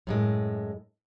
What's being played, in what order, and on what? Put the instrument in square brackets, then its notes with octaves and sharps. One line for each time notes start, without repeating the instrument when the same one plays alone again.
[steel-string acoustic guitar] F#2 A2 G#3